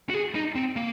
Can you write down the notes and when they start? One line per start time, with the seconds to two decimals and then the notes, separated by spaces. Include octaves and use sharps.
0.09 F#4
0.14 G#4
0.35 D#4
0.55 C4
0.76 A#3